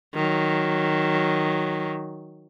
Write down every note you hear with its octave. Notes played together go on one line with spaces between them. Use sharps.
D#3 F#3